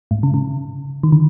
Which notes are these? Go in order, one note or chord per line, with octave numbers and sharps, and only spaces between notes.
G#2
C#3
C#3
D#3
D3